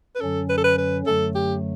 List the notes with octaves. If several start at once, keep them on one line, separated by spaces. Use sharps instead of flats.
B4
F#2 D3 F#3 C#4 A4
B4
A4
B4
B4
F#2 D3 F#3 A3 A4
G4